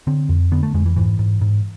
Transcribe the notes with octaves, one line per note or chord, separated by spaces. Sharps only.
D3 C4
F2
D3 B3
A3
F2 G#3
E3
G#2 E3
G#2
G#2